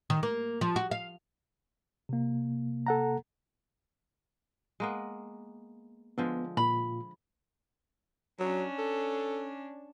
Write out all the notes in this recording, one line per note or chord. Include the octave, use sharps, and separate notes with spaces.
D#3
A#3
F3
F#4
F5
C3 A#3
A4 F#5 A#5
G#3 A#3 B3
D3 F3 G#3 B3
A#2 F4 B5
F#3 C#4 D4
A4